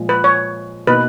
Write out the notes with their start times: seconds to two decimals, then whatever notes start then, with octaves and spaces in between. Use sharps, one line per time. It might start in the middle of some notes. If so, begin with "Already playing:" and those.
Already playing: A#2 F3 G#3
0.09 B4
0.24 C#5
0.87 B2 A#3 D#4 B4